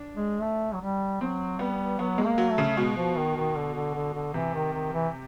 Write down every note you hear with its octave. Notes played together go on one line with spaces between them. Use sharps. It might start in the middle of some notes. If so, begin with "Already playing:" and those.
Already playing: D4
G#3
A3
F#3
G3
F#3 C4
G3 B3
F#3 B3
G#3
A#3
F#3
A3
C#3
B2 G#3
F3
D#3
D#3
D3
D3
D3
D3
C3 E3
D#3
D#3
E3